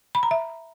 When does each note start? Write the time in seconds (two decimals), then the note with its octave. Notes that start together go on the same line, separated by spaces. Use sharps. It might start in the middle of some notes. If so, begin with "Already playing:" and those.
0.15 B5
0.23 A#5
0.31 E5